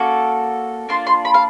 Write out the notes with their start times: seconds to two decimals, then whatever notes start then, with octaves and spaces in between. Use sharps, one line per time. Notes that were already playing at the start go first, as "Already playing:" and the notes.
Already playing: A#3 C#4 F#4 A4
0.89 A#3 D4 F4 C6
1.07 C6
1.25 B5
1.34 F5